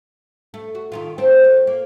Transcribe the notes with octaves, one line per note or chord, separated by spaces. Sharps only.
A3
F#4
D#3 A3 F4
A3 C4 C5
A3
A#3